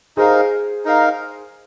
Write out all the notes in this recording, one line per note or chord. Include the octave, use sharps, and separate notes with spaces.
D#4 G#4 A#4 C5 F5
D#4 A#4 F5